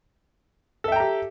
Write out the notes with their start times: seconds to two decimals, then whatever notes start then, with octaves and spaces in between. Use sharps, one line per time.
0.84 A4
0.88 E5
0.92 G5
0.96 A#5
1.00 G4